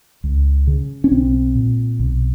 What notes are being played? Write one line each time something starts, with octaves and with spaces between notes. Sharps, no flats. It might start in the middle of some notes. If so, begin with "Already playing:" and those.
C#2
C#3
C#4
B1 C4
A#2
B1